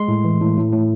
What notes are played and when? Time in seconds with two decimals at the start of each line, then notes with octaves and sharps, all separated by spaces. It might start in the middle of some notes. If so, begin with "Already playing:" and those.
Already playing: G#3 C6
0.08 A2
0.24 E3
0.40 A2
0.57 A2
0.73 A2